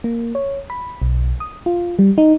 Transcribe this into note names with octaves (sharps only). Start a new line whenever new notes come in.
A#3
C#5
B5
B1
D#6
F4
G3
D#4